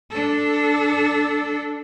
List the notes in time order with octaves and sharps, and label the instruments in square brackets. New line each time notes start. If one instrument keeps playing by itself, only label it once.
[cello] D4 A4